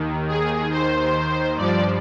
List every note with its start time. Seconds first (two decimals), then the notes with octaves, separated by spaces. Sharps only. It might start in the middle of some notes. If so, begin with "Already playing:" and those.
Already playing: D#2 D#3
0.28 G#4
0.71 C5
1.57 G2 F3 D5